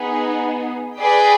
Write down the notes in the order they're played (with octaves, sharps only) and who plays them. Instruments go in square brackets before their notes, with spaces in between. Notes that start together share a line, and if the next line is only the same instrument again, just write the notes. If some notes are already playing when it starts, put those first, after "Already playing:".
Already playing: [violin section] B3 D#4 G#4
G#4 B4 D5 G5